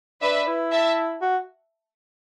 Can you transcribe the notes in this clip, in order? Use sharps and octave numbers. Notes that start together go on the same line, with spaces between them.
D4 B4 E5
E4
E5 A5
F#4